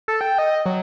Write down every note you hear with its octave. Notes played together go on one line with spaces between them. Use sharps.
A4
G5
D#5
F#3